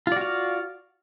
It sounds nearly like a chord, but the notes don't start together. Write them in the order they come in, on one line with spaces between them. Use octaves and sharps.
F4 D5 F#4 F5